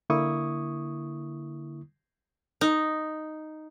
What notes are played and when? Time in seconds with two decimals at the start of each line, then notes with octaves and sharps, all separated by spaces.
0.10 D3 A#3 E4 C#6 D#6
2.61 D#4